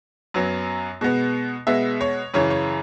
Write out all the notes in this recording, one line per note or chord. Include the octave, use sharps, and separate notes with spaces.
F#2 F#3 B3
B2 G#3 B3
B2 G#3 B3 E5
C#5
F#2 C#3 E3 C#5
C#5